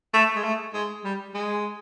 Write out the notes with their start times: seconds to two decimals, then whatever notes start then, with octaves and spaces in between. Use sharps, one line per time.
0.14 A3
0.36 G#3
0.44 A3
0.74 G#3
1.04 G3
1.35 G#3